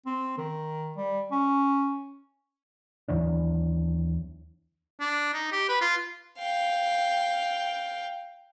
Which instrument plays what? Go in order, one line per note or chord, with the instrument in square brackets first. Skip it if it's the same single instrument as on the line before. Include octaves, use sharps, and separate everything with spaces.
[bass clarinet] C4
D#3
G3
C#4
[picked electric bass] D#2 E3 F#3 D4
[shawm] D4
D#4
G4
B4
F4
[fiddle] F5 G5